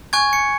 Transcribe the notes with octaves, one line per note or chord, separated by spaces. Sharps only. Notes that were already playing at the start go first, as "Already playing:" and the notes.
G#5 C#6 F#6 G#6
C#7